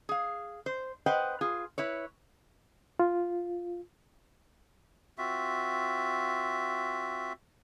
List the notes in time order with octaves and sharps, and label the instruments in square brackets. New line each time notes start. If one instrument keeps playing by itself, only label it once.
[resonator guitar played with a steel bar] G#4 F5
C5
B4 C5 D#5 F#5 G5
F4 G#4
E4 B4 C#5
[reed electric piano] F4
[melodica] C4 F4 F#4 E5